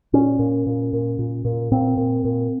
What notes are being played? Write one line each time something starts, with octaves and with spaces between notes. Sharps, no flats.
A#2 C#4
A#2
A#2
A#2
A#2
A#2
A#2 C4
A#2
A#2